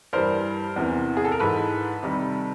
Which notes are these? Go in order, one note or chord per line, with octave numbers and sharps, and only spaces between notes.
G2 E3 G3 A#4 C5
E2 C3 E3
G#4
A4
A#4
G#2 E3 G#3 A4 B4
C3 D#3 G3